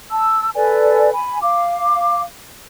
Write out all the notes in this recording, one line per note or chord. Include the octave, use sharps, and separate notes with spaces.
A5 E6
A4 B4 D5 G#5
G#5 B5
F5 D6